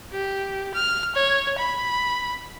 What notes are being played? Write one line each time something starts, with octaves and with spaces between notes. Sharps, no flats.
G4
F6
C#5
B5